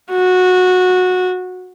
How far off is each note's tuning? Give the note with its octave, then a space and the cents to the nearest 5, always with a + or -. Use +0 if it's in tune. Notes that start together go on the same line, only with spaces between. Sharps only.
F#4 -15